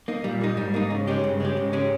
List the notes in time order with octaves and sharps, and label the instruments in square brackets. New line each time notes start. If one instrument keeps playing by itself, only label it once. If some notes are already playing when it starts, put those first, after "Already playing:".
[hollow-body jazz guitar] A#3 D#4
[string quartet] A#2 [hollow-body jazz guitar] G3
[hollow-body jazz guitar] A#3 D#4
[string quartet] G#2 [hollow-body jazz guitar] G3
[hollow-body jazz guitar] A#3 D#4
C#3
G#3 C#4 G4
[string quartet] G2 [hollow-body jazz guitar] C#3
[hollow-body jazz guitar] G#3 C#4 G4
[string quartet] G#2 [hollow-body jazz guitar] C#3
[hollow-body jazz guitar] G#3 C#4 G4